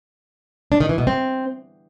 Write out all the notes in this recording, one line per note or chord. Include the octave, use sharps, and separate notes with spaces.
D4
D#3
E3
B2
C4